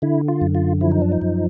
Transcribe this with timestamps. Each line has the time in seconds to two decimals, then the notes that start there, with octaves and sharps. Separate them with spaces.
0.02 D3 E4
0.28 F4
0.41 F#2
0.55 F4
0.81 F3 E4
0.92 D#4
1.02 D4
1.12 D#4
1.21 F#2